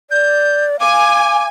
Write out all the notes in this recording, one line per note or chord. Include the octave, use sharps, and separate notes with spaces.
D5 G6
F5 G#5 D6